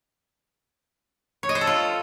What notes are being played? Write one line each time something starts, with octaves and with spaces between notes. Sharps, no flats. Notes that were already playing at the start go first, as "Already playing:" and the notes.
C#5
D#5
C5
A4
F4